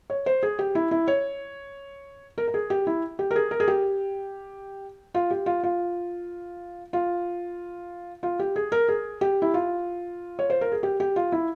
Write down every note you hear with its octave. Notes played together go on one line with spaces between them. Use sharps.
C#5
C5
G#4
G4
E4
E4
C#5
A#4
A#4
G#4
G4
E4
G4
A#4
G#4
A#4
G#4
G4
F4
G4
F4
F4
F4
F4
G4
G#4
A#4
G#4
G4
E4
F4
C#5
C5
A#4
G#4
G4
G4
F4
E4